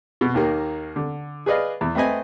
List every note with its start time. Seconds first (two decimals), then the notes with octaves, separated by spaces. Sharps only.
0.21 B2
0.34 D#2 D#3 A#3
0.96 D3
1.46 G#4 B4 D5 D#5 F5
1.81 E2
1.95 A3 C4 B4 D#5 G#5